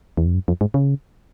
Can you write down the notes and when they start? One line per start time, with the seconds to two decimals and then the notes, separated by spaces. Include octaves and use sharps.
0.17 E2
0.26 F2
0.34 F#2
0.48 F2
0.61 G#2
0.74 C#3